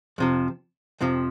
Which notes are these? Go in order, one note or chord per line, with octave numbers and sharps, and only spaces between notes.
F2 C3 F3
F2 C3 F3